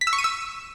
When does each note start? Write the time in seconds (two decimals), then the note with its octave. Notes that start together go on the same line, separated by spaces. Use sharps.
0.01 B6
0.07 E6
0.13 C#6
0.18 D#7
0.24 E6